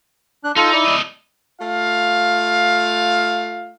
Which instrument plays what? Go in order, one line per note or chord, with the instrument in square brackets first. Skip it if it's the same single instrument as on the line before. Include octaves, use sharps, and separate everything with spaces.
[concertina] D4 F#6
[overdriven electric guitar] D#4 [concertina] F4 A4
[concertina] E4 D5
[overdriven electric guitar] A3 D#5
[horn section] A3 F4 F5